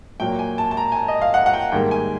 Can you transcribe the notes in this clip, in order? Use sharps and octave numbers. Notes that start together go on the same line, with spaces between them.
A#2 F#3 A#3 G5
G#5
A5
A5
A#5
G#5
A5
D#5
F5
F#5
F#5
G5
G#2 D#3 G3 A#3 G5
G#5